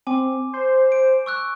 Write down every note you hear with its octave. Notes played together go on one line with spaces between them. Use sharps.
C4 G#5 D6
C5
D7
C#6 E6 F#6